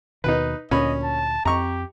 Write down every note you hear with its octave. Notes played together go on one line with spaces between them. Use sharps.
D#2 B2 D#3 D#4 B4
D2 A#2 C#4 D#5 B5
A5
F2 C4 G4 A#5 C#6